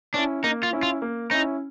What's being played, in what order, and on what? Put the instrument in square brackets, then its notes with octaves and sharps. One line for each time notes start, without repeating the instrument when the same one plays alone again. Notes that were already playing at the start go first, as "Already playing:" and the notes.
[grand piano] C#4 E4 [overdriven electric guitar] D4
[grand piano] A#3 [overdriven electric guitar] D#4
[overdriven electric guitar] F4
[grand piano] C#4 E4
[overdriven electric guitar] F4
[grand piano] A#3
[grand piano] C#4 E4 [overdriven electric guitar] D#4